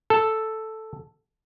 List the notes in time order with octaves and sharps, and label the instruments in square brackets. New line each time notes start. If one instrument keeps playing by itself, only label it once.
[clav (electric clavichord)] A4